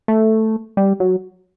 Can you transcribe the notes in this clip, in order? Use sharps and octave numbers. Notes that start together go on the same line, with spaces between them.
A3
G3
F#3